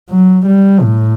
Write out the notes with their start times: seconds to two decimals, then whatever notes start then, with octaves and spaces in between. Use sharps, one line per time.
0.10 F#3
0.47 G3
0.82 A2